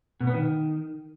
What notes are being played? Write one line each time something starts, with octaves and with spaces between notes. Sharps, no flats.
B2
B3
D#3